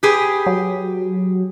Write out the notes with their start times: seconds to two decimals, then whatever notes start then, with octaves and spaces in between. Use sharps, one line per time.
0.03 G4 G#4 B4
0.46 F#3